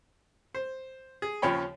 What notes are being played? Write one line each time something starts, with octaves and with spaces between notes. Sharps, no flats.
C5
G#4
D#2 C#3 F3 C#5 G5 B5